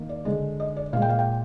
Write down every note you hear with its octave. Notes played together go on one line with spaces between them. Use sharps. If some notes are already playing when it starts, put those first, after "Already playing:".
Already playing: D#3 A#3
D5
D3 G#3
D#5
D5
A#2 G#3 F5
G5
F5
G5